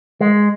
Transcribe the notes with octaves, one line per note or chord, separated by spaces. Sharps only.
G#3